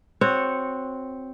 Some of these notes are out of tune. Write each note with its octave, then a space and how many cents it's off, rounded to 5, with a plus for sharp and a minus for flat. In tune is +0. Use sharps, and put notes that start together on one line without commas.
C4 +0 F#4 -15 C#5 -5